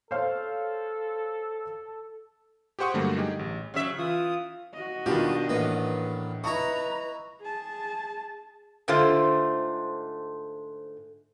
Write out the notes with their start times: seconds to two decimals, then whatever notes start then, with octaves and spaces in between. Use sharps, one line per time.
0.11 A4 C5 C#5 F5
2.79 G4 G#4 C5 F#5 C#6 D#6
2.94 G2 D3 F#3 G3 A3 A#3
3.17 D#4 G4 G#4
3.39 A1
3.74 C#3 F#3 E5
3.98 E3 F4 D#6
4.74 F#4 D#5
5.06 B2 D#3 G3 D4 F4 G4
5.49 A1 A#3 B3
6.44 E4 B4 D#5 A#5 C#6
7.41 G#4 A5
8.88 G#2 D3 A3 F4 C5